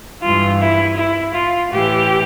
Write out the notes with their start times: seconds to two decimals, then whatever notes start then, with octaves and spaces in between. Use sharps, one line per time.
0.24 G2 E3 F4
0.60 E4
0.98 E4
1.34 F4
1.72 A2 E3 G4